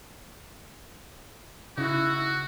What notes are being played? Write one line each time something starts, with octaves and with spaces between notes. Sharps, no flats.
C#3 D#4 E4 F#4